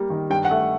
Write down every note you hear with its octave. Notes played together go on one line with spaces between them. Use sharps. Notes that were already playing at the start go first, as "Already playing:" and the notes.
Already playing: G3 A#3
D#3
G2 G5
F#5
A3